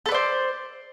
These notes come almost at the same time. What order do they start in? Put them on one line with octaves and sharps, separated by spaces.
A4 B4 D5 C5